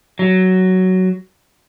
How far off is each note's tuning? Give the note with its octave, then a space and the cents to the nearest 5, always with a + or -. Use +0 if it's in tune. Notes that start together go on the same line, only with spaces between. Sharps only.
F#3 +10